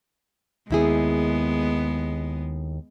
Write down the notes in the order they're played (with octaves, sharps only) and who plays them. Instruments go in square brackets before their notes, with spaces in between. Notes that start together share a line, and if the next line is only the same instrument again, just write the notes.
[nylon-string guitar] D#2 E4 G#4 [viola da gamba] G#3 B3